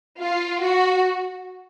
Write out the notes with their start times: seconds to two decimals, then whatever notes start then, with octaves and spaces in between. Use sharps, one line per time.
0.19 F4
0.62 F#4